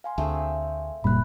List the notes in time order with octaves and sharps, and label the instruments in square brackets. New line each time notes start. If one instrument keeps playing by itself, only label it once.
[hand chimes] F5 G#5 C6
[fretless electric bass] D2 [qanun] A3 C4 G#4
[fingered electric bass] F#1 A#2 G3 [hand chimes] B5 F#6